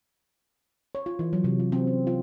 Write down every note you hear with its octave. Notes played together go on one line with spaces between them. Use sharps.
C#5
F4
E3
F#3
C3
F4
C4
C#4
F4